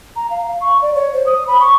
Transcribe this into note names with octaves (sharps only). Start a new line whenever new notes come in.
A#5
F5
F5
C#6
D5
C#5
C5
D#6
B5
C#6